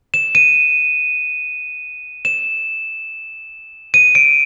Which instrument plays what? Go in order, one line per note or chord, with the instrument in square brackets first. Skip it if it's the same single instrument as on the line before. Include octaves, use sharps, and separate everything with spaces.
[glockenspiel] E7
D#7
E7
D#7
D7